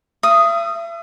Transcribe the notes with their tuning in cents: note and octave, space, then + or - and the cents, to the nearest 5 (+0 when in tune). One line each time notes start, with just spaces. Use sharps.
E5 +40 D#6 +0